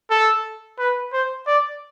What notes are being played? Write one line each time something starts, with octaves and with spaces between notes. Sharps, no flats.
A4
B4
C5
D5